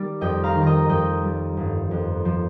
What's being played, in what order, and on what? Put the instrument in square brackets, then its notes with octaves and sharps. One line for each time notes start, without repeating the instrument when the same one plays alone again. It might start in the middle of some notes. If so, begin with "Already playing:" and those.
Already playing: [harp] D#3 G3
F2 D#5 G5
F5 A#5
D#3
D#5 G5 A#5
F2 D#5 G5
G3
G1
F2
F3